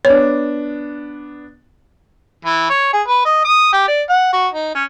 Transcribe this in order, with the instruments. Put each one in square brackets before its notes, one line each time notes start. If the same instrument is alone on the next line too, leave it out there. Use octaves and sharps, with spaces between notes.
[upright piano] B3 D4 [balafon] C#5
[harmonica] E3
C#5
G#4
B4
D#5
D#6
G4
D5
F#5
F#4
D#4
C#4